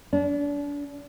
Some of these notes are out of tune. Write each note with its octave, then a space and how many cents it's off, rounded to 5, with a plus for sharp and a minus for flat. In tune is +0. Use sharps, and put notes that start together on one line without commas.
D4 -35